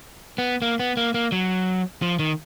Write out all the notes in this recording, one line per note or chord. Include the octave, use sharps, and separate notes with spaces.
B3
A#3
B3
A#3
A#3
F#3
F3
D#3